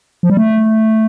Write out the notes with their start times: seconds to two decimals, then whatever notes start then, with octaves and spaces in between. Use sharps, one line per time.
0.23 F3
0.30 G3
0.37 A3